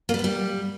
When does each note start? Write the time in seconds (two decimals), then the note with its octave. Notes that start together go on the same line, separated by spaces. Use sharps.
0.09 A#3
0.14 G3
0.19 B3
0.24 G3